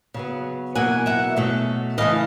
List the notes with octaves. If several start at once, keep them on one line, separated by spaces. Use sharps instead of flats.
C#3 F#3 B3
E2 B2 F#3 A#3 F#5 G#5
E5 F#5
B2 F#3 A3 C#4
C#3 E3 A3 D#5 F5